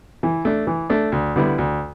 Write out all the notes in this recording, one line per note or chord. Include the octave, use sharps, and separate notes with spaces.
E3
A3 D4
E3
A3 D4
D2
D3 G3 B3 E4
D2